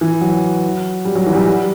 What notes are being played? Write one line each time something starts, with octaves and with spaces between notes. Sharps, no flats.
E3
F#3
G3
F#3
E3
G3
F#3
G3